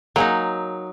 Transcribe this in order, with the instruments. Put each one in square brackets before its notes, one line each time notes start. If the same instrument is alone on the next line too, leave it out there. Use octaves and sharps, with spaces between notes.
[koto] F#3 D#4 [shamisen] A#3 G#4